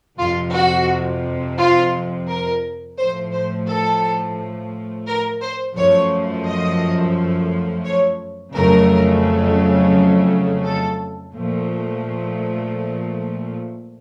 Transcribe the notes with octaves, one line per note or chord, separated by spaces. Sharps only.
F2 C3 F3 F4
F#4
F4
A#4
A2 F3 A3 C5
C5
A4
A#4
C5
F#2 F3 A3 C#5
D#5
C#5
F2 C#3 F#3 A3 A#4
A4
A#2 F3 A3